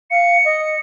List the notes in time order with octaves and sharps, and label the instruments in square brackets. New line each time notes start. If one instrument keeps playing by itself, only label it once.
[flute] F5 [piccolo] C#7
[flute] D#5